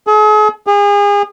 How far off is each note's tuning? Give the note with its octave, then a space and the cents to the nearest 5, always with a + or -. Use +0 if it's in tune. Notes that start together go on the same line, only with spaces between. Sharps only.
G#4 +40
G#4 -35